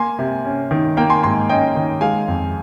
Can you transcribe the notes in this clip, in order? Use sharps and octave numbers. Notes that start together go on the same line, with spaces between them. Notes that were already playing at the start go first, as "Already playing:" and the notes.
Already playing: A#3 G#5 C6
C3
C#4
D#3
A#3 G5 A#5
G#5 C6
G#2 G#5 C6
C#4 D#5 G5
D#3
G#3 F5 G#5
F2